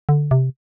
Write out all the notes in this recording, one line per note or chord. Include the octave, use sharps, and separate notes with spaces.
D3
C3